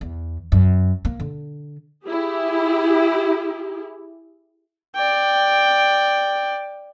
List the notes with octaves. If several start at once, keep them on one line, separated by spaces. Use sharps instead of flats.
E2
F#2
A#3
D3
E4 G4 G#4
D5 G5